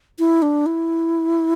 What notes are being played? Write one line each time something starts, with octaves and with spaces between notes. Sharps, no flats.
E4
D4
E4